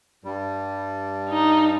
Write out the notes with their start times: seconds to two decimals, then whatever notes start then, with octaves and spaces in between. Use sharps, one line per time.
0.24 G2 G3
1.29 D#4